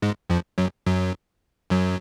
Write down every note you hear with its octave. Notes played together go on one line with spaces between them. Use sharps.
G#2 G#3
F2 F3
F#2 F#3
F#2 F#3
F#2 F#3